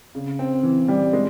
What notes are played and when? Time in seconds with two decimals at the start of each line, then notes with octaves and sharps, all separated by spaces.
0.15 C#3
0.39 C4
0.63 E3
0.88 G3
1.13 G#3